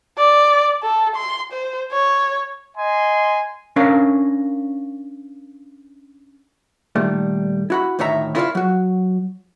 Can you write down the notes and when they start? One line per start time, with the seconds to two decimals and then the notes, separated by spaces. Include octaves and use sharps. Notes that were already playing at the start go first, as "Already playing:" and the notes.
0.18 D5
0.83 A4
1.16 C6
1.52 C5
1.93 C#5
2.77 D#5 G#5 C6
3.76 C#4 D4 A#4 F5
6.96 A#2 D#3 G3 A3
7.70 E4 F#4 B5
7.99 D2 A2 D#3 C#5 E5 A#5
8.36 E4 F4 A#4 C#5 D5 F5
8.55 F#3 F#4